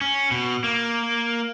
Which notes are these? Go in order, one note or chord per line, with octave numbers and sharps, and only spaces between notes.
C#4
B2
A#3